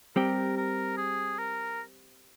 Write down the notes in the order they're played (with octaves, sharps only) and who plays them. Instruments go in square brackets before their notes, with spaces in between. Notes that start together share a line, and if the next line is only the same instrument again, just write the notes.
[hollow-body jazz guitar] G3 C4 G4 [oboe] A#4
[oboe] A#4
G#4
A#4